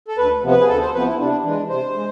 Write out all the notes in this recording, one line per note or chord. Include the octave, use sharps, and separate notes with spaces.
A4
D2 B4
C3 F3 B3
B4
G#4
D2 A4
C5
C3 F3 B3 B4
E4
C3 D4
E3 G#3 D4
C3 C5
G#3